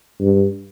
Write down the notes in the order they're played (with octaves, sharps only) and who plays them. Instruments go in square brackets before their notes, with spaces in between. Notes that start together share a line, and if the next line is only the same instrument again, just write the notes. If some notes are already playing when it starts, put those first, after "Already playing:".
[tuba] G2